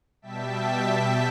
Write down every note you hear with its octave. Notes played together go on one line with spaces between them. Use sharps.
B2 G3 E5 G5 A5 B6